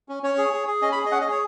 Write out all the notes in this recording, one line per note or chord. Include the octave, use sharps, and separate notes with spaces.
C#4
C#4 C#5
G#4
G#4
G#4
C#4 D#5
B5
G#4
D#5
C#4 F#5
D#5
G#4 C#5